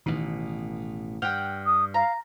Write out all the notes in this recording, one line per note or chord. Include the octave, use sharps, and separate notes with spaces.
A1 B2 D#3
G2 F#5 G5 F6 G6
D#6
F5 A#5